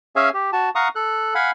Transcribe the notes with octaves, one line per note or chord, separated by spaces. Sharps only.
C#4 G#4 C#5 E5 F5 G#5
G4
F#4 A5
F5 F#5 A#5 C#6 D#6
A4 F#6
F5 F#5 G#5 B5